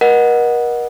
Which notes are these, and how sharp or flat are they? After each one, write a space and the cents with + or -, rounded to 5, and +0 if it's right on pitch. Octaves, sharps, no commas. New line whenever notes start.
A#4 +40 D#5 -15 F#5 -5